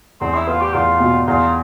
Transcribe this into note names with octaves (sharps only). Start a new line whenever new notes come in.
E2 C4
E4
B3 F4
G4
E2 F4
B2
E2 F4